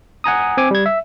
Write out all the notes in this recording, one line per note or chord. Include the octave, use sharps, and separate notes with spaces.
F#5 G#5 A#5 D#6
C4 G#5 D6
G3 G#6
E5